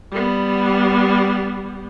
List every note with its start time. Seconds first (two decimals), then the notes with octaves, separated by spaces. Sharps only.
0.11 G3 B3